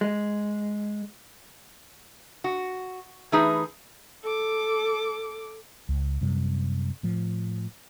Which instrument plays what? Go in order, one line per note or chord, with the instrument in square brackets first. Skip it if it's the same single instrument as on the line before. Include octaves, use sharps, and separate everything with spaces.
[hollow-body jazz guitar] G#3
[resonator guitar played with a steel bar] F#4
E3 A3 D#4 G#4 B4
[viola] A4 D6
[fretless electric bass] C#2
F#2 C3 G3
A2 F3